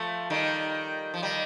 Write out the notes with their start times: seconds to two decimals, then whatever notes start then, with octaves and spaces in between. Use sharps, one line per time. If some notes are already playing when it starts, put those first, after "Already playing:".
Already playing: F3 A3
0.30 D#3 G3
1.14 F3
1.22 D#3 G3